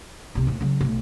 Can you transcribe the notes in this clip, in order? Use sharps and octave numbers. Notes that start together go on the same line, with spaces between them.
B1 C3
D#2 A2
C#3 F#3
B1 A3